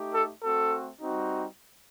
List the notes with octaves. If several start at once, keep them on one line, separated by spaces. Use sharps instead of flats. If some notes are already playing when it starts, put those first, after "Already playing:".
Already playing: A3 D#4 G4
A4
A3 C4 F#4 A4
G3 C4 D#4 F#4